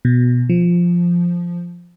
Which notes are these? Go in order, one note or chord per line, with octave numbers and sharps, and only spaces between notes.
B2
F3